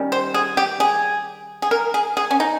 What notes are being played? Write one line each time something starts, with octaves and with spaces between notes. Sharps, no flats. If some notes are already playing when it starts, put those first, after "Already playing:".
Already playing: D#3 G3 C#4
C5
G#4
G4
G#4
G#4
A#4
G#4
G#4
C#4
D#4